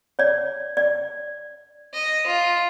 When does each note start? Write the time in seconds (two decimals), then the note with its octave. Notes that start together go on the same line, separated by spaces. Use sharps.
0.19 C#5 D5
0.77 D5
1.94 D#5
2.27 F4